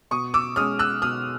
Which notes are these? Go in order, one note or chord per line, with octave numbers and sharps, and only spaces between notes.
B2 C#6 D#6
D6 E6
G#3 C#4 D#6 F6
E6 F#6
B2 D#6 F6